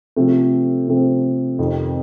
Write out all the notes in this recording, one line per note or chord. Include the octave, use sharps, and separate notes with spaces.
C3 F3 A3 C4
C3 F3 A3 C4
F2 C3 D#3